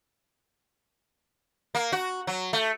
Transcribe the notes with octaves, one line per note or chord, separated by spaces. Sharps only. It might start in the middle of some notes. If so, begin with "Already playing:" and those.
A#3
F#4
F#3
A3